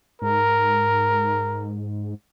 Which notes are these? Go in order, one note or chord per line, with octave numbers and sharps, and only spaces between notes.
G#2 A#4